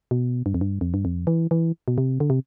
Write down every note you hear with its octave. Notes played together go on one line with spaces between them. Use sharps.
B2
G2
F2
G2
F2
G2
F2
E3
E3
B2
C3
D3
C3